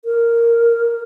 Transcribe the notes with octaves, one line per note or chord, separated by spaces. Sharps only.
A#4